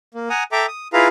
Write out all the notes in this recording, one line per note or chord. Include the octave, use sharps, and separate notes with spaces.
A#3
F#5 G#5 A#5 D#6
A4 E5 G5 A#5 D6
D#6
E4 F4 G#4 B4 F5 A#5